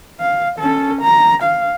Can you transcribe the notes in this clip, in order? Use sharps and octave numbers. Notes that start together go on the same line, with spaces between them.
F5
C#4 A4
A#5
F5